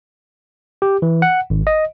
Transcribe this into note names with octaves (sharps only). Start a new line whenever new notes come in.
G4
E3
F#5
G#1
D#5